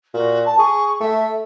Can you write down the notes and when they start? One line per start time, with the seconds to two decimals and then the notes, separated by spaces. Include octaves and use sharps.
0.14 A#2 F#4
0.45 A5
0.58 G#4 C#6
1.00 A3 E5